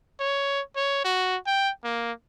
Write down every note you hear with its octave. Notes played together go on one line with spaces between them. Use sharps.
C#5
C#5
F#4
G5
A#3